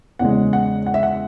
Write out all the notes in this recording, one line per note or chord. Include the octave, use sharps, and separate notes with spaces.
E2 C#3 G#3 F#5
F#5
F#5
E5
F#5